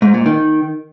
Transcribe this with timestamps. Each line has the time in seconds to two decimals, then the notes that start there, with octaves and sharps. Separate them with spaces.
0.02 G#2
0.14 A#2
0.26 D#3